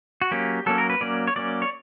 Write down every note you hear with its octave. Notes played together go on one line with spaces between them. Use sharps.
F#4
F#3 A#3 C#4 G4
F#3 A#3 C#4 A4
A#4
B4
F#3 A#3 C#4 D5
C#5
F#3 A#3 C#4 D5
C#5